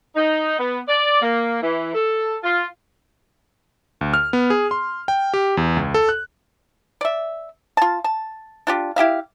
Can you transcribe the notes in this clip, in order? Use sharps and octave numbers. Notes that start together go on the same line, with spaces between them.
D#4
B3
D5
A#3
E3
A4
F4
D2
F6
B3
G#4
C6
G5
G4
E2
C#2
A4
F#6
D5 E5
F4 A5
A5
D4 F4 G4
E4 G4 E5 F5